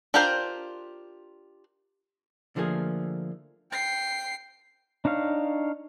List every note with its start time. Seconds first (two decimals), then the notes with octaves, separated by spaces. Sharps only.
0.14 D4 F4 G4 A#4 C5
2.56 D3 F3 A3 A#3 G#4
3.71 G5 C7
5.05 D4 D#4 C#5 F5